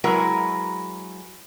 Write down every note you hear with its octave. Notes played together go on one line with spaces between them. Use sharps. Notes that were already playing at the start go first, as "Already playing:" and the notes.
F#3 G#3 E4 F#4 A#4 B4